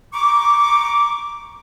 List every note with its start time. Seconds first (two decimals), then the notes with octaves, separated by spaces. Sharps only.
0.13 A#5 C#6 D6